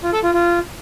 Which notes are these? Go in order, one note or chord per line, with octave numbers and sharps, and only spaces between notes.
F4
A4
F4
F4